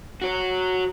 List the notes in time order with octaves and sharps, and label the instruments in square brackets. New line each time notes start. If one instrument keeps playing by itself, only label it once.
[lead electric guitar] F#4 C#5